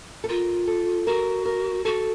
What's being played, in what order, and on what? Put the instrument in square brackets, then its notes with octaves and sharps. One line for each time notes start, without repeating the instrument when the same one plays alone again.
[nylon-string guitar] A4
[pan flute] F4 [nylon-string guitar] A#4
[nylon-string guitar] A4
[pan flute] F#4 [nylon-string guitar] A#4
[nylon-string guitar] A#4
[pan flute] F#4 [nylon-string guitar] A4